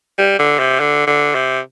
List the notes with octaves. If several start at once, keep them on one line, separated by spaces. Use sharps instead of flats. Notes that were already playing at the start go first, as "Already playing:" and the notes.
G3
D3
C3
D3
D3
C3